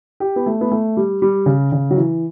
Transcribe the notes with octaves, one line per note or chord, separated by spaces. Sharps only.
G4
B3
A3
B3
A3
G3
G3
C#3
C#3
F#3
E3